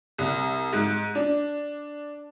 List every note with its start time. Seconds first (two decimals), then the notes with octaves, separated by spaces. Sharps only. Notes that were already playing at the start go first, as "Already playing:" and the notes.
0.18 C2
0.73 G#2
1.15 D4